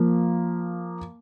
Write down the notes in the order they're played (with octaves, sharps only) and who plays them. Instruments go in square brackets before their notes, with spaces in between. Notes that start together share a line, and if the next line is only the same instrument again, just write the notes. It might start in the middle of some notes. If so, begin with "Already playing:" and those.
Already playing: [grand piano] F3 A#3